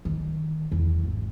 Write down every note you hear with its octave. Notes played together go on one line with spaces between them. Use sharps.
D#3
E2
G#1